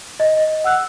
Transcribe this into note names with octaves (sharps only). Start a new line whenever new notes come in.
D#5
F#5 E6 F#6